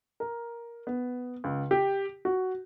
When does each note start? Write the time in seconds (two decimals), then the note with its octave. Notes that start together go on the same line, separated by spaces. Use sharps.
0.20 A#4
0.87 B3
1.44 C#2
1.71 G4
2.25 F#4